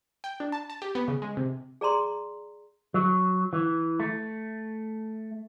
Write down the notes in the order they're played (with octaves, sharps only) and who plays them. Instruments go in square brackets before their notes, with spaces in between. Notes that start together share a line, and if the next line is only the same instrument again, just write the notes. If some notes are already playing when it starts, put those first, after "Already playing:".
[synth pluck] G5
D4
A5
A5
G4
B3
C#3
G#3
C3
[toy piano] G#4 D5 A#5 C6
[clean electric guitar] F#3
E3
A3